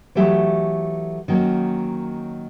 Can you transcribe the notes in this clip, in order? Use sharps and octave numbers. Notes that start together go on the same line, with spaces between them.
E3 F#3 A3 G4 E5
D#3 F#3 A#3 C#4